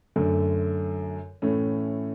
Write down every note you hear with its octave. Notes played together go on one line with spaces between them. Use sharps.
F#2 D3 A3
A2 E3 A3 C#4